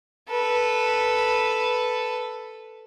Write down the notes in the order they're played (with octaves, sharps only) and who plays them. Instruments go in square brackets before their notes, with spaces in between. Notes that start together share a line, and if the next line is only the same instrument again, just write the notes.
[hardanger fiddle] A4 B4